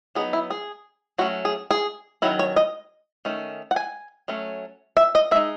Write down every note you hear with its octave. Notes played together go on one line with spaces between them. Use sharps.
F#3 B3 D#4 G#4
E4
G#4
F#3 A3 C#4 F#4
G#4
G#4
D#3 F#3 C#4 E4
C#5
D#5
D#3 A3 C#4
F#5
G#5
F#3 A3 C#4
E5
D#5
G#3 D#4 E5